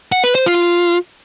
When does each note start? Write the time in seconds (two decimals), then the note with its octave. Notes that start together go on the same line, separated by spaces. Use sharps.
0.12 F#5
0.24 B4
0.35 C5
0.46 F4